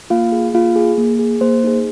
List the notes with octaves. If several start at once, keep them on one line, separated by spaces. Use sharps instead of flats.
A#3 F4 F5
G#4
A#3 F4 F5
G#4
A#3
G#4
A#3 C5
D#4 G#4